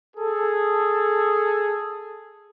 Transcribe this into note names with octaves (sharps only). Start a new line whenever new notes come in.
G#4 A4